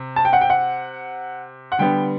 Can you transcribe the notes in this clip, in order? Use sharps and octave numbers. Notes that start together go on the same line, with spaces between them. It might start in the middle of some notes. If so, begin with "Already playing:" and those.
Already playing: C3
A5
G5
F#5
G5
F#5
F#5
D3 G3 B3 G5